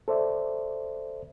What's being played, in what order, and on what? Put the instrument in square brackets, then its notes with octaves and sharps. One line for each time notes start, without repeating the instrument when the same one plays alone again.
[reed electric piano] A4 C5 D5 E5